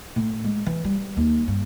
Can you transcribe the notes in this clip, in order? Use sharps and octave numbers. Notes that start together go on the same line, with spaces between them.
A2
G#3
E3
G3
D#2
G2